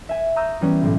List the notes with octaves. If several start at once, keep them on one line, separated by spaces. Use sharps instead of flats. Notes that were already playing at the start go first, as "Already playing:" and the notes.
E5 G#5
A#5 C#6 D#6 E6 G6
E3 G3 B3 C#4
B1 A2